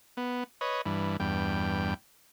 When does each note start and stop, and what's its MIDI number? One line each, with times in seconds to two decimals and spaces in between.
0.17 0.44 59
0.61 0.82 71
0.61 0.82 73
0.61 0.82 75
0.86 1.17 43
0.86 1.17 52
1.20 1.94 40
1.20 1.94 43
1.20 1.94 79